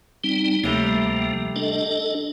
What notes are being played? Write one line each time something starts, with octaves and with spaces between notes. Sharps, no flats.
G3 C4 D#4
D2 C3 F3 G3 A3 A#3
D4 A4 D#5